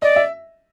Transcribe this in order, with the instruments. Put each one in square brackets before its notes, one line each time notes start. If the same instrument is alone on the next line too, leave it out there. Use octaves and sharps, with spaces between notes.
[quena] D5 [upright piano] D#5
[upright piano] E5